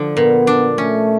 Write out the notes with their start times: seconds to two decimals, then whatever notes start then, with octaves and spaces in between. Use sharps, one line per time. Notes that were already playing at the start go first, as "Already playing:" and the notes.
Already playing: D3 F3
0.17 A#2 B3
0.47 D4
0.78 A3 C#4